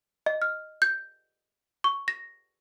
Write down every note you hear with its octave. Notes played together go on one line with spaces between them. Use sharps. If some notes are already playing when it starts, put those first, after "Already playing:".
D#5
F6
G6
C#6
A#6